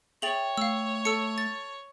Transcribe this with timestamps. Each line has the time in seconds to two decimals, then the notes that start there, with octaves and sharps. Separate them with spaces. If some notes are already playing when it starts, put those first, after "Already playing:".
0.22 G#4 C#5 E5 G5 A6 F7 F#7
0.57 A3 F5 E6
1.05 A4 E6 C#7
1.38 A6